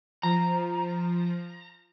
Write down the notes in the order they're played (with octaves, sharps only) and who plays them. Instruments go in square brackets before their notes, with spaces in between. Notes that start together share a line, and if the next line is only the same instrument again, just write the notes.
[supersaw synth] F3 [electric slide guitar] A#5